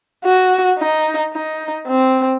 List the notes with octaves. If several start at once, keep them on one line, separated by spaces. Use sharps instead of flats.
F#4
D#4
D#4
C4